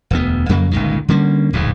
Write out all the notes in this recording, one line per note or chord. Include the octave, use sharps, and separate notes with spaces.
E1 D2 B3
F2 C#3 F#3 A#3
G1 C#2 A#2 D#3
D3 G3 A#3 C#4
D1 A#1 E2 G#2